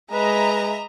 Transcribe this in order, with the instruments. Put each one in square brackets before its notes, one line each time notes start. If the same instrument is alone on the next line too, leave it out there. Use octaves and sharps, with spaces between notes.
[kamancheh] G#3 [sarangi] B4 [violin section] D#5 E5 A#5